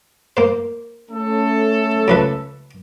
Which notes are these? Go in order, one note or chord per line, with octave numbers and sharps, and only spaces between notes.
A#3 C5
A3 C#4 A4
C#2 F3 B4